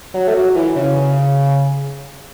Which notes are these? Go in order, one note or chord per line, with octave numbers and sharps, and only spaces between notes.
F#3
A3
F#3
E3
C#3
C#3